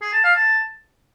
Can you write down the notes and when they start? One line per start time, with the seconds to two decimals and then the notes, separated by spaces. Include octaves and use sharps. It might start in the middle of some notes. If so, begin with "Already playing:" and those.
0.02 G#4
0.13 A5
0.24 F5
0.35 A5